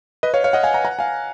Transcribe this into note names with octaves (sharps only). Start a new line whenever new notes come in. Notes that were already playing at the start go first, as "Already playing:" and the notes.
B4 D#5
C#5 F5
C#5 F5
D#5 F#5
F5 G#5
F#5 A#5
F#5 A#5
F5 G#5